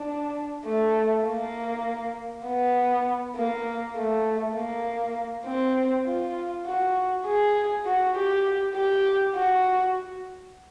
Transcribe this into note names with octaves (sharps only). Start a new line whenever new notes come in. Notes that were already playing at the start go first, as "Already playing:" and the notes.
Already playing: D4
A3
A#3
B3
A#3
A3
A#3
C4
F4
F#4
G#4
F#4
G4
G4
F#4